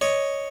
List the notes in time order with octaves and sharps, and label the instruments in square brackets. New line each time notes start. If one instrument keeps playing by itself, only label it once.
[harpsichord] C#5 D#5